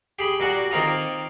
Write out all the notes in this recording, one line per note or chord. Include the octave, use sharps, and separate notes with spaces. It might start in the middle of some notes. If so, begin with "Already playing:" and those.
G4 G#4 B5
A#2 G3 F#4
D#3 A#3 C4 F4 A#5 D#6